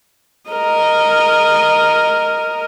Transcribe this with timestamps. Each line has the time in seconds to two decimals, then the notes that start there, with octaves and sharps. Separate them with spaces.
0.50 A#4 D#5